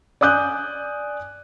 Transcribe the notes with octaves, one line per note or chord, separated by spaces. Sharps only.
D5 G#5 D#6 F#6 G6